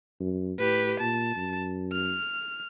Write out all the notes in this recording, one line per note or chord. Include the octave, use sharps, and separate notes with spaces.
F#2
A2 G4 B4
A#2 A5
F#2
F6